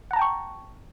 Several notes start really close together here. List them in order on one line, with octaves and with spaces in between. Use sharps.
F#5 A#5 A5 G5 C#6